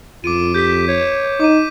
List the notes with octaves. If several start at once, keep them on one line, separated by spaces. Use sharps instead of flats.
F2 F4 D6 D7 D#7
G4 G6 B6
C#5
D#4 D6 D#7